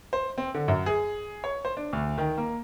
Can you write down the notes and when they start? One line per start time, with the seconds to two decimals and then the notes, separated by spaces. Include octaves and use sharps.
0.13 C5
0.38 C4
0.54 D3
0.68 F#2
0.86 G#4
1.44 C#5
1.65 C5
1.77 D4
1.93 D2
2.18 D#3
2.38 A#3